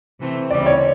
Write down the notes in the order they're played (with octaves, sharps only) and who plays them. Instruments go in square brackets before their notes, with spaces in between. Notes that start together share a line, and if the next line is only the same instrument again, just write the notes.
[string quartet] C3 E3 A3 C4
[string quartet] D2 C#3 E3 G3 C4 [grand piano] D5
[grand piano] C#5